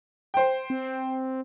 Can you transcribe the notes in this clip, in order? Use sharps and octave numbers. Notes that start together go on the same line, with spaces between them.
C5 G5
C4